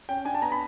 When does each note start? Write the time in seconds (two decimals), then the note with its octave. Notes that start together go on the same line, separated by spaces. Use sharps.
0.09 C#4 G5
0.25 D4 G#5
0.35 A5
0.42 B3 A#5
0.52 B5